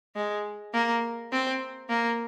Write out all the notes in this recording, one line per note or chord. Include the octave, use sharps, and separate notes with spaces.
G#3
A#3
C4
A#3